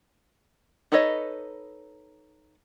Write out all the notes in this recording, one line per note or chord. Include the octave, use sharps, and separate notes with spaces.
D#4 A4 B4 C#5 D#5